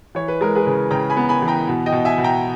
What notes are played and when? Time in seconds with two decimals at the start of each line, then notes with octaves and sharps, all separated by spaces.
0.15 E3 C#5
0.28 B4
0.41 G#3 A#4
0.55 G#4 B4
0.67 C#3
0.91 C#3 G5 A#5
1.10 G#5 B5
1.17 B3
1.29 G#5 B5
1.42 E3
1.48 G5 A#5
1.68 B2
1.86 D#5 G5
1.92 B2
2.05 E5 G#5
2.18 B2
2.24 G5 A#5